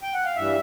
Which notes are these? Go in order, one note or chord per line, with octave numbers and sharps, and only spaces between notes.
G5
F#5
F5
G2 E3 G3 E5